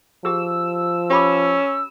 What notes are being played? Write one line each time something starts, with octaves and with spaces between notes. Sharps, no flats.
F3 G4 G#4 E6
C#4 G4 B5 D6